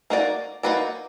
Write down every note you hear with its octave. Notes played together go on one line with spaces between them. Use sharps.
A#3 D#4 F#4 B4 D5
A#3 D#4 F#4 B4 D5